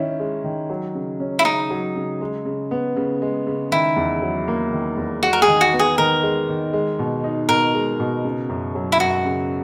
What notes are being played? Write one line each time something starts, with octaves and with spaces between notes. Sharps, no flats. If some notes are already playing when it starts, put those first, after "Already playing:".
Already playing: D#3 C#4 E4
G#3
D#3
F#3
C#3
C#4
E4
C#3 D#4
F#3
C#3
G#3
C#3
B3
C#3
G#3
C#3
D#3 E4
E2
F#3
A#3
D#3
E2
G#3 F#4
A#4
G#4
D#3
F#4
B3
G#4
D#3 A#4
G#3
D#3
G#3
B2
D#4
B2 A#4
G#3
B2
C#3
F#2
F#3
E4
F#2 F#4
C#3